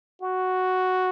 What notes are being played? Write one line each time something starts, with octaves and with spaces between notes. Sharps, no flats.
F#4